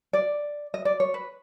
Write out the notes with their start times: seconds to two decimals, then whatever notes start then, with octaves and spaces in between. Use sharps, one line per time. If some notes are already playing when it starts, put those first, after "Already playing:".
0.13 D5
0.74 D#5
0.85 D5
1.00 C#5
1.14 B4